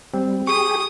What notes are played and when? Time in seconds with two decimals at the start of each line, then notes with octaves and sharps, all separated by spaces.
0.14 G3 C4
0.47 G4 G#4 C#6 D#6